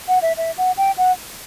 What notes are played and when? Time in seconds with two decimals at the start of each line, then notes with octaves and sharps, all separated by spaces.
0.08 F#5
0.22 E5
0.37 E5
0.58 F#5
0.77 G5
0.98 F#5